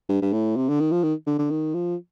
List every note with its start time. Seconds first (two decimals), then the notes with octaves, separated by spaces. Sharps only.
0.09 G2
0.22 G2
0.33 A2
0.56 C3
0.69 D3
0.80 D#3
0.92 F3
1.03 D#3
1.27 D3
1.39 D3
1.50 D#3
1.74 F3